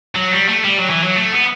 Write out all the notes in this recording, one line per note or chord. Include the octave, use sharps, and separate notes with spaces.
F#3
G3
A3
G3
F#3
E3
F#3
A3
B3